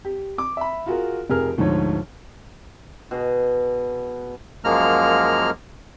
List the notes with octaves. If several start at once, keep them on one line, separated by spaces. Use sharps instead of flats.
G4
D6
E5 B5
F4 F#4 G#4 A#4
F1 F2 G4 G#4 A#4 F6
D2 G#2 F3 C#5
B2 G#4
F#2 F3 G#3 A#3 A#5 F6